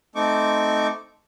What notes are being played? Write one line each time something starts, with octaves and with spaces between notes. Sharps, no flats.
A3 C4 D#4 C#6 D6